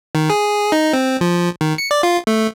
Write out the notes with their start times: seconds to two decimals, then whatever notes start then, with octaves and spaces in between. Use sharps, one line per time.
0.15 D#3
0.30 G#4
0.72 D#4
0.93 C4
1.21 F3
1.61 D#3
1.78 C#7
1.91 D5
2.03 F4
2.27 A3